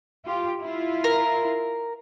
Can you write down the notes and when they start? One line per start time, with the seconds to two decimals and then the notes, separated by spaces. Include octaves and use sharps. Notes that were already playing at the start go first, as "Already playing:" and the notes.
0.25 F4 G4
0.61 E4 F4
1.04 A#4